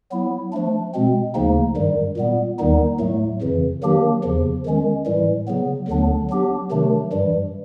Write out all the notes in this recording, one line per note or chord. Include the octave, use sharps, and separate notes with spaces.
F#3 B3 E4
F3 A3 D4
B2 G#3 C4
D2 C#3 F3 A#3 D#4
G2 D#3 G3
A#2 G3 B3
D#2 D#3 G3 B3 D#4
A2 F#3 A3
F2 C#3 E3
D#3 F#3 A#3 D4 G4
E2 C#3 F3
D#3 G#3 C#4
A2 E3 G3
C#3 F#3 B3
D2 D3 F#3 B3 D4
F#3 B3 D4 G4
C3 D#3 F#3 A3 D4
G2 E3 G3